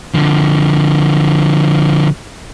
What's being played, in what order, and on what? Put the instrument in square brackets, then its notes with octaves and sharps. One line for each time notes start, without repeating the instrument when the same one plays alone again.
[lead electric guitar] D3 F3